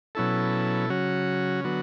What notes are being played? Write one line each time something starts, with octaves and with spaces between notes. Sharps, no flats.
B2 F#3 C#4 E4 A4
C#3 F#3 C#4 F#4
D3 F#3 B3 F#4